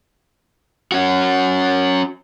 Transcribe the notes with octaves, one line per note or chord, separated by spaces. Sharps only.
C#4 F#4